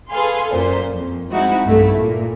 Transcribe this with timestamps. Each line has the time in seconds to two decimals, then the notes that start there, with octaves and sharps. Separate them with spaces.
0.11 G#4 A4 B4 F5 G#5 C6
0.49 F#2 A#2 C5
0.92 F2
1.32 G#3 C4 D#4 E4 F#4
1.65 B1 G2 A3 E4
1.96 A#2